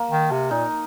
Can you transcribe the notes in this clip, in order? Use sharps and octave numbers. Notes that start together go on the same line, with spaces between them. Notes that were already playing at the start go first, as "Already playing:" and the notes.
Already playing: A#3
D#3
C3
A#2 D#4